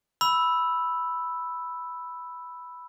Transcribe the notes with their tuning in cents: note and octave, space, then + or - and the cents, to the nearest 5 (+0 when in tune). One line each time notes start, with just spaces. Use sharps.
B5 +0 E6 +0